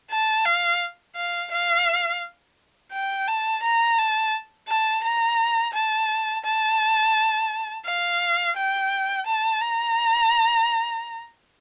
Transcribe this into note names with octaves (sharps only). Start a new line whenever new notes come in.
A5
F5
F5
F5
G5
A5
A#5
A5
A5
A#5
A5
A5
F5
G5
A5
A#5